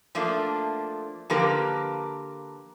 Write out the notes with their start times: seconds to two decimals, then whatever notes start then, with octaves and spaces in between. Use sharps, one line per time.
0.15 F3 A3 A#3 D4
1.30 D3 F3 A#3 G4 A#4 B4